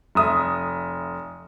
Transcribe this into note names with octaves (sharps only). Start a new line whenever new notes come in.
F1 E5 D#6